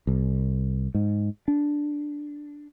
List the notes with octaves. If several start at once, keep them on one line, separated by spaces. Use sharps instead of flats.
C2
G#2
D4